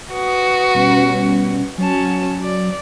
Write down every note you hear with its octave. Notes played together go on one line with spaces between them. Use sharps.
F#4 B4 D#6
B2 G3 C#4
F#3 C#4 A5
D5